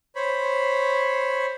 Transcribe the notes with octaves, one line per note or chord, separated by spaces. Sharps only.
C5 C#5 B5